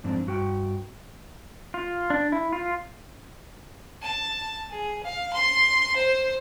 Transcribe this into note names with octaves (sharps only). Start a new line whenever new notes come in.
F2 G#2 C4 D4
G2 F#4 G5
F4
D4
E4
F4
A5
G#4
F5
C6
C5